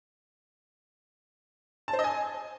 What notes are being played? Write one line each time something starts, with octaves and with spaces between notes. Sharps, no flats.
A5
C5
D#5
G#5